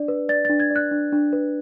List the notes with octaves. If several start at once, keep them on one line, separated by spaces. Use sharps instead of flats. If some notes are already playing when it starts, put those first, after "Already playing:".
Already playing: D4 D5
B4
D5 A6
A6
D4
G#6
D5
F#6
D4
D4
B4